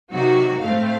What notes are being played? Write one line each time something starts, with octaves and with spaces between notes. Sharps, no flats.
C3 D#3 F#3 F#4
A2 A3 C4 F5